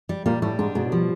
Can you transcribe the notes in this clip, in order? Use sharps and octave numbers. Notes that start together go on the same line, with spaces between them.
G3
A#2 G3 A#3
A2 G3 A3
G#2 G#3 D4
G#2 B2 G#3
F#3
F3 G3